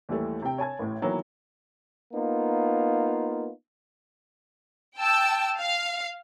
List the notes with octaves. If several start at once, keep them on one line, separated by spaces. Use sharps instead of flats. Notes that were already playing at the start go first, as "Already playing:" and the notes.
D#2 E3 G3 A3
C3 G5
C#5 G#5 A5 G#6
A1 A2
D#3 E3 F#3 A#3 B3
A#3 B3 D#4 F4
G5 A5 E6
F5